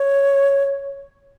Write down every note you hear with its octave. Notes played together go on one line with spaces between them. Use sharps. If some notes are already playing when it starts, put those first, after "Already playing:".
Already playing: C#5